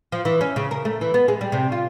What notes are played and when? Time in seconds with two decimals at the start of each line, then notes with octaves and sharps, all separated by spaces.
0.12 F3
0.25 E3
0.41 C#4
0.56 C#3
0.71 A#4
0.85 A3
1.01 E3
1.14 B3
1.28 G#3
1.41 G3
1.52 C3
1.72 F4